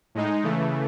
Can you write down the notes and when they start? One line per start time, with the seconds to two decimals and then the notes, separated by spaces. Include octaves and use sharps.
0.15 A2 G#3 D#4
0.43 C#3 E3 A3